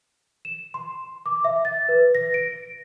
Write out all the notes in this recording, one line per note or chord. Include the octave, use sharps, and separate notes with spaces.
E7
C6
D6
E5
A6
B4
A#6
D7